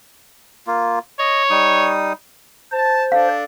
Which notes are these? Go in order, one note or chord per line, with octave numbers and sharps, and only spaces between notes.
A#3 F4
C#5 D#5
G3 D#4 D#6
C5 A5
D4 A4 F5